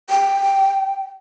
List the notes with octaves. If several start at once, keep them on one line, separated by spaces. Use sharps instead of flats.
G5